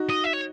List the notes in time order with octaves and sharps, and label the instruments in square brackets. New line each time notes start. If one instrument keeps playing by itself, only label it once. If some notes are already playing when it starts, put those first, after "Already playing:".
Already playing: [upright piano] D#4 F#4
[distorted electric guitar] D#5
E5
C#5